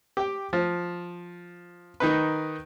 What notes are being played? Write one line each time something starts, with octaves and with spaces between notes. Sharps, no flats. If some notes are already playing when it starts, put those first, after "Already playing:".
G4 G5
F3
D#3 D#4 B4